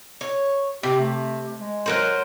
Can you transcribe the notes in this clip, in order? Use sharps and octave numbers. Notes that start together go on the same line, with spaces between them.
C#5
C3 G4
A3
G#3
F#3 A#4 C5